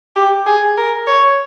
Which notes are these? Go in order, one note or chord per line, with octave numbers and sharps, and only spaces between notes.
G4
G#4
A#4
C#5